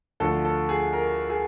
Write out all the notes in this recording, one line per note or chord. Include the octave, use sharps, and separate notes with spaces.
D2 D3 F3 A4
A4
G#4
A#4
G#4